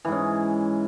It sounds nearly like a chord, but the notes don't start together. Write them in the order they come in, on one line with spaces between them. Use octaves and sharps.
E3 G#2 C#4